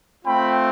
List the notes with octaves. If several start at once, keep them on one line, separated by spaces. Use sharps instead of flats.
A3 C4 F4 G5 B5